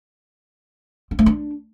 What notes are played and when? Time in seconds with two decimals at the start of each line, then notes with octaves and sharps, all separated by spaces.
1.11 C4
1.19 A3
1.26 D4